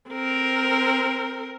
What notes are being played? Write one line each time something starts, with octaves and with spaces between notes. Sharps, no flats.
C4 A#4